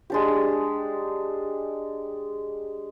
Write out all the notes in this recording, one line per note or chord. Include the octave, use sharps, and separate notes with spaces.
G#3 D4 G4